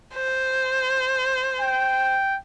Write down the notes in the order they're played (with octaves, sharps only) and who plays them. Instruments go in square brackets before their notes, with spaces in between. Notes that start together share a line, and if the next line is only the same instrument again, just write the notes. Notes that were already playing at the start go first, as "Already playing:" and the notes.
[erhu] C5
[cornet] G5